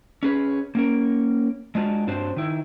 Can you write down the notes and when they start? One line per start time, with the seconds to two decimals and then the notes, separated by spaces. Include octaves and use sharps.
0.23 C#4 G#4 B4
0.75 A#3 C#4 A#4
1.75 G#3 D4 F4 F#4
2.07 G2 C4 D4 F#4 C5
2.36 D#3 E4